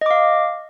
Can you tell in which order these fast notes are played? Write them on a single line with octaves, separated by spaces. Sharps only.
D#5 D6 F5